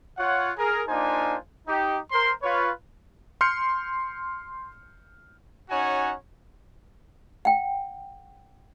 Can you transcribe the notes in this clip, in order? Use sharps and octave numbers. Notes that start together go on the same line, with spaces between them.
F4 C#5 F#5
G#4 A#4
A#3 D4 D#4 F4 C5 G#5
D#4 G4
A#4 C5 C6
F4 B4 C#5
C6 F6 G6 C7 C#7
C#4 D#4 F#4 C#5 F#5 G#5
F#5 G5